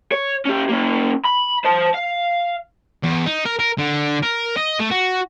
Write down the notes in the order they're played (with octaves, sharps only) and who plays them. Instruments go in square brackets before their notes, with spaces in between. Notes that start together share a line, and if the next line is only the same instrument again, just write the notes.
[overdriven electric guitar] C#5
C#4 G4
A#3 C#4
B5
C5 A5
F5
[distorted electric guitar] E2
D#4
A#4
A#4
D3
A#4
D#5
A3
F#4